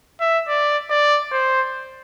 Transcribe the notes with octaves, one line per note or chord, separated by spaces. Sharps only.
E5
D5
D5
C5